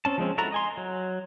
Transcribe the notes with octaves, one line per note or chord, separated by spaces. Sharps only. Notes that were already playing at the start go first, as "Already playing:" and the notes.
C4 C#4 A5
F3 G#3 C4 C#4
E4 F#4 A4 A#5
D#5 G#5 C6
F#3